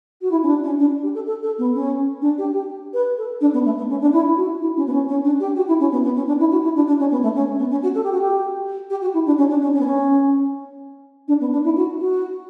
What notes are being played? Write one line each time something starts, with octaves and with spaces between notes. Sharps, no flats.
F#4
E4
C#4
D4
C#4
D4
G4
A4
A4
A4
B3
C#4
D4
G4
G4
B4
A4
D4
B3
A3
B3
C#4
D4
E4
F#4
E4
C#4
B3
C#4
C#4
D4
G4
F#4
E4
C#4
B3
B3
C#4
D4
E4
F#4
E4
D4
D4
C#4
B3
A3
C#4
B3
C#4
F#4
A4
G4
F#4
G4
G4
F#4
E4
D4
C#4
D4
C#4
C#4
B3
C#4
D4
B3
D4
E4
F#4
F#4